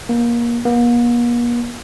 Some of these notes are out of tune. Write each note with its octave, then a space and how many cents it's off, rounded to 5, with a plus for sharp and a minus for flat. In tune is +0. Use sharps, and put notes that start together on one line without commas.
A#3 +25
A#3 +45